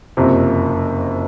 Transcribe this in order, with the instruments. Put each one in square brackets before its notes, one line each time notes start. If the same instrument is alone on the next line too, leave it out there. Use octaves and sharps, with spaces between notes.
[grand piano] F#1 F2 C3